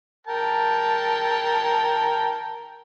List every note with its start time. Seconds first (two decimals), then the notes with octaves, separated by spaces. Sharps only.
0.27 A#4 G5 A5